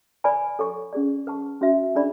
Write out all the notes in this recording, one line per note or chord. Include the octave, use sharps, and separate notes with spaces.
B4 D5 G#5 B5
A4 C#5 F#5 C#6
C#4 G#4 D5
B4 F#5 A5 C#6
C#4 F#4 B4 E5
D4 G#4 D5 F#5 B5